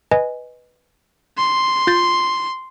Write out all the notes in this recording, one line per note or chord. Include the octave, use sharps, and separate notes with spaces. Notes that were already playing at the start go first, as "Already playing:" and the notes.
B4 D#5 G#5
C6
F4 G6 A6